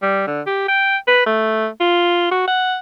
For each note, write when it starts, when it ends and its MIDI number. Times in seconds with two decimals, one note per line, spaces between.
0.02 0.27 55
0.27 0.42 50
0.46 0.66 67
0.68 0.97 79
1.07 1.23 71
1.26 1.68 57
1.80 2.26 65
2.32 2.45 66
2.48 2.77 78